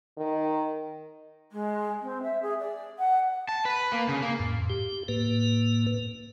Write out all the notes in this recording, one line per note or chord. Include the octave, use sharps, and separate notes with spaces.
D#3
G#3
C4
E5
G#4
D5
F#5
A5
B4
A#3
C#3
A#3
F2 A2
G4
A2 A#3 B4